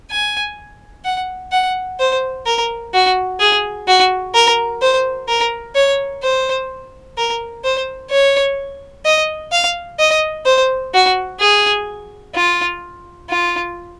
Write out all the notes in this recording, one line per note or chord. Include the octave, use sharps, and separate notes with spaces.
G#5
F#5
F#5
C5
A#4
F#4
G#4
F#4
A#4
C5
A#4
C#5
C5
A#4
C5
C#5
D#5
F5
D#5
C5
F#4
G#4
F4
F4